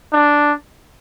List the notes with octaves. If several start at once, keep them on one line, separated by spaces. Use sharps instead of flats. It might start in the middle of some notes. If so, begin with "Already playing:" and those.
D4